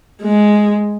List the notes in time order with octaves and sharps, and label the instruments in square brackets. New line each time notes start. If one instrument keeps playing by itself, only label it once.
[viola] G#3